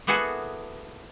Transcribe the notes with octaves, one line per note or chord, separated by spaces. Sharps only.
A#3 B3 E4 F#4 G#4 A4